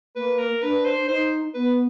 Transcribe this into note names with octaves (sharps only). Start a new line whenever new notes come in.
A#3 B4
A#4
D4 B4
C5
D#4 C5
B3 B4